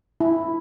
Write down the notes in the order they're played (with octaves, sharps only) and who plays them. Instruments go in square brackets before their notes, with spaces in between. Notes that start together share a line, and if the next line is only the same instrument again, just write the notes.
[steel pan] E4